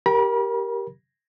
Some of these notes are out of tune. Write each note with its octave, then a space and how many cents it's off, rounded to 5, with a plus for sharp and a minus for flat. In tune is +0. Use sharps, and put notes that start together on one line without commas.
G4 -5 A#4 +10 B5 -40